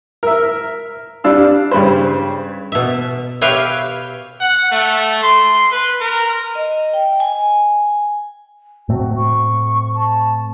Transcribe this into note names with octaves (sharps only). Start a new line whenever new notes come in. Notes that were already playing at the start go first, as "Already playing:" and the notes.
A#4 E5
G3 D4 F5 E6
G2 C#3 B4 C5
B2 E5
G4 B4 C#5 E5 F5 G5
F#5
A3
C6
B4
A#4
D#5
G5
G#5
A2 A3 C4 F#4
C#6
A5